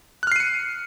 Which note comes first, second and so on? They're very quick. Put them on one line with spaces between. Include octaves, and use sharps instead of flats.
F#6 F6 C7 D#7 C#7